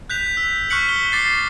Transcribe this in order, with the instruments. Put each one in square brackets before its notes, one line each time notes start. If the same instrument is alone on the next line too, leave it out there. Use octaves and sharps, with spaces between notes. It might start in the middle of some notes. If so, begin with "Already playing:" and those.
[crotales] F#6 G6 B6 F7
E6
C#6 F6 F#6 B6 C#7 F#7
G7
D6 A6 C7